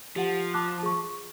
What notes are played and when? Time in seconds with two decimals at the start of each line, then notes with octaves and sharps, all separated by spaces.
0.16 F3 G4 F#5
0.54 A5 D6 F#6
0.83 G#4 C#6